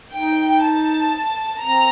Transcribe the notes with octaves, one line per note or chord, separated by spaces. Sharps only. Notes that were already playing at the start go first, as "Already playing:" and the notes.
D#4 G5
A5
C4 A#5